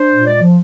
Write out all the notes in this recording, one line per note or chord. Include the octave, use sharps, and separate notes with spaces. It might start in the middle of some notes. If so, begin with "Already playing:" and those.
Already playing: D4 C5
A#2
G#3 D5
F3